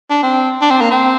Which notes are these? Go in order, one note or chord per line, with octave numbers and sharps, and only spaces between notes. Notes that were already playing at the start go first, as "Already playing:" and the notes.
D4
C4
D4
C4
A#3
C4